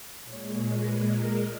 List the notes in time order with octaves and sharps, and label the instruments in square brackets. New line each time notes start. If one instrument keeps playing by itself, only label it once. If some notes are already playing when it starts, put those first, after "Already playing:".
[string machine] A#2 G#3 C#5
C#5
B4
A#4